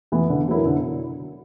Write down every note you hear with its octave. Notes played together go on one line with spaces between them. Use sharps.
E3 B3 E4
D3
F#3 B3 E4 A#4
D3